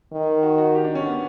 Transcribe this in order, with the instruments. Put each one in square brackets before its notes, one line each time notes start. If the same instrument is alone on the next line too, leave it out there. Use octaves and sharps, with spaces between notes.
[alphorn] D#3
[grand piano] F#4
F#4
G4
D4
C#4
B3